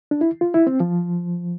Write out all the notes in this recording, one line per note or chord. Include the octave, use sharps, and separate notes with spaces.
D4
E4
F4
E4
C4
F3